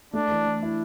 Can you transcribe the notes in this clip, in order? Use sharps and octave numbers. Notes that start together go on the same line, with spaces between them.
A3 D4
E3
E3
E4